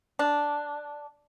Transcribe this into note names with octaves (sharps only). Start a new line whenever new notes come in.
D4